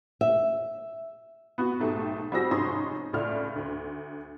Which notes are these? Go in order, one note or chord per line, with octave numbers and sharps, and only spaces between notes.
E5
B3 F#4
B1 G#2 A3 G4
G3 C4 F#4 G#4 E6 A#6
F1 G#2 C#4 D#4 C6 A#6
C#2 A2 D4 F6
D2